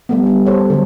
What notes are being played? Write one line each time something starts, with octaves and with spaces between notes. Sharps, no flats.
G3 A3 B3
G3 B3
A4 C5 C#5
D3 F#3